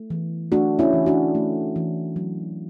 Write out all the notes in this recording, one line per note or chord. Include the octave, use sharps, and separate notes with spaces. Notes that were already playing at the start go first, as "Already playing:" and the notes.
Already playing: A3
E3
A3 D4 F#4
C#4 E4
E3
D4 F#4
A3
E3
F#3